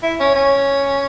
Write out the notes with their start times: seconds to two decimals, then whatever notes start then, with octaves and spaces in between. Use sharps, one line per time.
0.03 E4
0.20 C#4
0.35 C#4